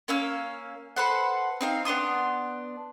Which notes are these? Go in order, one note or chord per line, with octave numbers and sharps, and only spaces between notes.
A#3 C#4 F5 E6
A4 B4 C5 F#5
C4 D#4 F5
B3 D4 C6 D#6